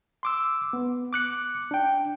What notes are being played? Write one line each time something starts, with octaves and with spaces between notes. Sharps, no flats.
C6 D6 E6
B3
D6 F#6 C#7
D4 G5